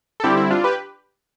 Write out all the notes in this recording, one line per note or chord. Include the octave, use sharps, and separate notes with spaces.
A4
D3 G3 C4 E4 G4
E4
D4 F4
G4 B4